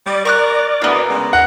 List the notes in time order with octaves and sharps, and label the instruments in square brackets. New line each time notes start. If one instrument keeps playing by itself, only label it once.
[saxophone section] G3 [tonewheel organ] D5
[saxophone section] A#4 [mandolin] C#6 D6 F#6
[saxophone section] D2 E4 [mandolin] A#3 B3
[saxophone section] C#3 G#3
[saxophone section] G#2 G#4 A#4 [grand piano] F#5